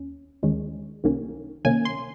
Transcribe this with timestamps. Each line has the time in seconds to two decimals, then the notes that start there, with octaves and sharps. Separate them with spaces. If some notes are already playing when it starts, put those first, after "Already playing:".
Already playing: D#2 C#4
0.43 D#2 D#3 G#3 C#4
1.04 C2 C3 D#3 A#3 C#4
1.65 C2 C3 D#3 A#3 C#4 G#5
1.85 C6